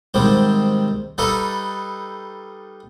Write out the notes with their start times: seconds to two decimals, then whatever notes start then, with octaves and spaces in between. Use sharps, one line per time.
0.14 G#2 C3 D#3 G3 C4
1.18 G3 D#4 A4 B4 F5